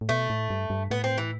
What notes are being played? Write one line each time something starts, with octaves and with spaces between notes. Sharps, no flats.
A2
B2 A3
A2
G2
G2
A2 B3
C4
E3